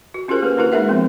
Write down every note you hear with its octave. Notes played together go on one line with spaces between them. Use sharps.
F#4
C#4 F4 G4 G#4 A#4 C5
A#3 C#4 B4
A#3 D4 E4 F#4 A#4 B4
G#3 D#4 G#4 A#4 E5 F#5
F3 B3 C4 F4